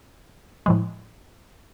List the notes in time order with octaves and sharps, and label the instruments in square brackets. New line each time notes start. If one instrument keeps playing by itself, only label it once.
[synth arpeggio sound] A2 F3 G#3